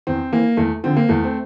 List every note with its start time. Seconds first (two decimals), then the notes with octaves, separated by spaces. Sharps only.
0.07 E2 C4
0.32 E3 A#3
0.57 E2 A3
0.84 D3 F3 C4
0.97 A#3
1.09 E2 A3
1.24 C4